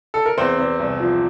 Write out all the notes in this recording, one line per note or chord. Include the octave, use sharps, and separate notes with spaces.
A4
A#4
E2 C4 C5
E2
C2
F3